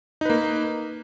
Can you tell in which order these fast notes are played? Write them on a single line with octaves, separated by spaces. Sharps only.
D#4 B4 A#3